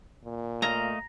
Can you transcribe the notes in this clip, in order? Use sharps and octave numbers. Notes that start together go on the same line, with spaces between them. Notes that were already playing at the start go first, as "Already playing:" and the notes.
A#2
A3 D#5 F5 A#5